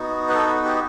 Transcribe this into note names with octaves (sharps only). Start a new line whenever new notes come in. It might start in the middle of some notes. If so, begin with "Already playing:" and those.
Already playing: B3 D#4 F#4
B4
A4
B4
G4